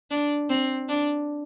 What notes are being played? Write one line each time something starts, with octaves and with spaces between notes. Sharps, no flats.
D4
C4
D4